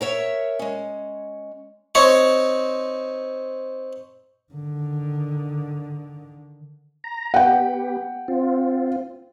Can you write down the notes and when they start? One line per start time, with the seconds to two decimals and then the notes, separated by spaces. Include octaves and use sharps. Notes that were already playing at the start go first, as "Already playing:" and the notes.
0.01 A#4 C#5 E5
0.59 G#3 C#4
1.95 C4 D#4 C#5
4.52 D3 D#3
7.04 A#5
7.34 B3 G4 F#5 G5
8.28 C4 F4